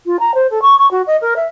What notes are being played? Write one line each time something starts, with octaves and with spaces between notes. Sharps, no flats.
F4
A#5
C5
A4
C#6
C#6
F#4
D#5
A#4
E5